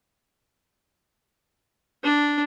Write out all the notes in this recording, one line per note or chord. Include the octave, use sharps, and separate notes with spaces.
D4